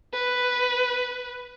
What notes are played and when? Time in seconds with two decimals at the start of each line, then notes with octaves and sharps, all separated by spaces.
0.13 B4